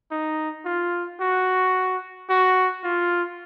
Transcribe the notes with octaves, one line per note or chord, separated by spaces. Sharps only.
D#4
F4
F#4
F#4
F4